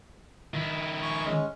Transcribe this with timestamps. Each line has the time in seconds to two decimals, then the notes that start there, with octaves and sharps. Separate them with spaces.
0.54 D#3 E4
1.02 G#5 A#5 C#6
1.25 G#3 C#4